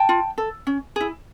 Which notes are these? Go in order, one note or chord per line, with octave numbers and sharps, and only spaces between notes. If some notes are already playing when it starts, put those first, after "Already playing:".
Already playing: G5 A5
F4
A4
C#4
E4 G#4